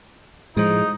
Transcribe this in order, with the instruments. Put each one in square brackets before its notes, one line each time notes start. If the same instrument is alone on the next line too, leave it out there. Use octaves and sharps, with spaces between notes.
[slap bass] A2 F3 [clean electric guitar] G#3 [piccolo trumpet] D#4